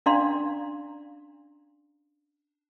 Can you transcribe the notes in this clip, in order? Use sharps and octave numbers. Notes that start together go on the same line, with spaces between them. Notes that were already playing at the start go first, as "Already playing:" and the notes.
C#4 D4 D5 F5 A#5 C6